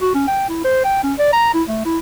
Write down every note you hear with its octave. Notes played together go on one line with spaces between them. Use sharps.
F#4
C#4
G5
E4
C5
G5
C#4
D5
A#5
E4
A3
E4